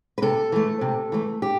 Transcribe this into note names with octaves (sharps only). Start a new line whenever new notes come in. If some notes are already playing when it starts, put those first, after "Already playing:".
B4
C3 A4
E3 A3
C3
E3 A3
G4